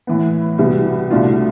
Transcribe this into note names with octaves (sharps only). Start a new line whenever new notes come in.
A2 E3 B3
C2 B2 G3 B3
C2 B2 A3 D4 F4